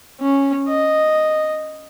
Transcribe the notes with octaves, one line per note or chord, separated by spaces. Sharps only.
C#4
D#5